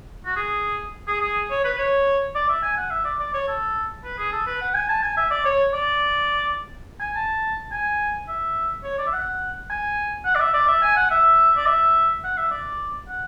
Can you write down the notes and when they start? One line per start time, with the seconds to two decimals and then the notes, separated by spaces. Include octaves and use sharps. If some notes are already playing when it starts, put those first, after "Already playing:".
0.26 F#4
0.36 G#4
1.08 G#4
1.21 G#4
1.50 C#5
1.64 B4
1.78 C#5
2.35 D5
2.49 E5
2.63 G#5
2.77 F#5
2.90 E5
3.05 D5
3.20 D5
3.34 C#5
3.47 A4
4.04 B4
4.18 G#4
4.32 A4
4.46 B4
4.61 F#5
4.74 G#5
4.89 A5
5.02 G#5
5.17 E5
5.31 D5
5.45 C#5
5.73 D5
7.00 G#5
7.15 A5
7.72 G#5
8.28 E5
8.84 C#5
8.98 D5
9.06 E5
9.13 F#5
9.70 G#5
10.25 F#5
10.35 D5
10.40 E5
10.53 D5
10.67 E5
10.82 G#5
10.96 F#5
11.11 E5
11.57 D5
11.66 E5
12.24 F#5
12.37 E5
12.51 D5
13.08 F#5